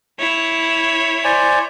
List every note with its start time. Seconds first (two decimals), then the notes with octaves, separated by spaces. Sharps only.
0.19 E4 C#5
1.24 C5 D5 G#5